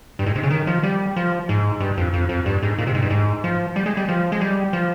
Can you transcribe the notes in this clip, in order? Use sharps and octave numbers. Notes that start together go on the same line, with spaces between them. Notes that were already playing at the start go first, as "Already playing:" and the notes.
G2
G#2
C3
C#3
D#3
F3
G3
F3
G#2
G2
F2
F2
F2
G2
G#2
A#2
C3
G#2
G2
G#2
F3
G3
G#3
G3
F3
G#3
G3
F3